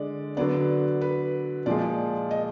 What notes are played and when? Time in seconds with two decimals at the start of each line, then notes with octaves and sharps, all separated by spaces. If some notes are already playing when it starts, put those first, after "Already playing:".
Already playing: D3 G#3 D5
0.37 D3 F#3 B3 D5
1.01 B4
1.66 A#2 F3 G#3 D5
2.31 D#5